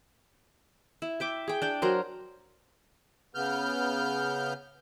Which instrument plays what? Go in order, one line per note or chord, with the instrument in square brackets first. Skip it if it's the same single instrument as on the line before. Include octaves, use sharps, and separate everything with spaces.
[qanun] E4
E5 G5 D6
G#4 G5
D4 G5
F#3 A#4 C5
[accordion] C#3 B3 F6 G6